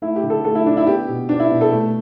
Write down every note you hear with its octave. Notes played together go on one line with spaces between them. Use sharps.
A3 E4
G4
D3
A4
A3 A4
E4
D3 D4
E4
B3 G4
B2
B3 D4
E4
B2
A4
A3